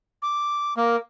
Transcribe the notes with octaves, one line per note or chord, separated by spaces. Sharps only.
D6
A#3 A#4